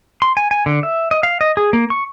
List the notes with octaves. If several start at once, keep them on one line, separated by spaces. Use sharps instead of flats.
C6
G#5
G#5
D3
E5
D#5
F5
D#5
G#4
A#3
C#6